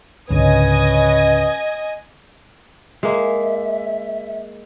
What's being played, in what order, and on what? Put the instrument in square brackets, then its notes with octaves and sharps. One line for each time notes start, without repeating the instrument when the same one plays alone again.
[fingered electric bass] C#2 G#2 D3 [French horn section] C#4 B4 [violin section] D#5 G#5 D#6
[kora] G#3 A#3 [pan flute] E5